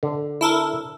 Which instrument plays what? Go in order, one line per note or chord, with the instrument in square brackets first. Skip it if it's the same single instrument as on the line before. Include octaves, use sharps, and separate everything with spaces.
[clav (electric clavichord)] D3
[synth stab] E4 A4 A#4